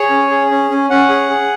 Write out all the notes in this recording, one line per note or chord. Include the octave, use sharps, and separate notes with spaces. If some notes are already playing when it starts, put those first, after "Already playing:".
Already playing: G#4 C#5
C#4
G#4
C#4
C#4
C#4 F#5
G#4
G#4